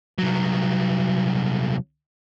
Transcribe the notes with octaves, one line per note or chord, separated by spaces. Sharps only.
C2 F#3